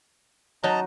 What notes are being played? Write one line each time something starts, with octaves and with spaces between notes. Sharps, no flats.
F#3 D#4 D#5 A5 A#5